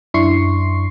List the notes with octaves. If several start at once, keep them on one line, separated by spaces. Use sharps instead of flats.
F#2 D4 E4 C6 C#6 C7